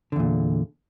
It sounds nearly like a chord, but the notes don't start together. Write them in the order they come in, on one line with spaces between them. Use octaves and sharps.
D3 E2 A#2